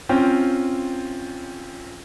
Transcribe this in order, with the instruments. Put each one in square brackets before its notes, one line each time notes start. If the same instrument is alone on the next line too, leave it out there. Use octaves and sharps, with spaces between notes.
[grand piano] C4 C#4 F4 G5